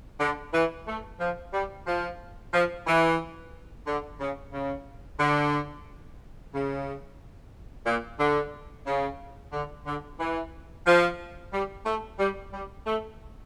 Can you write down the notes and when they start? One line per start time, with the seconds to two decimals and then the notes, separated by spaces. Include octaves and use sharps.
0.20 D3
0.54 E3
0.87 A3
1.20 F3
1.54 G3
1.87 F3
2.54 F3
2.87 E3
3.87 D3
4.20 C#3
4.53 C#3
5.20 D3
6.54 C#3
7.86 A#2
8.20 D3
8.87 C#3
9.53 D3
9.86 D3
10.20 E3
10.87 F3
11.53 G3
11.86 A3
12.19 G3
12.53 G3
12.86 A3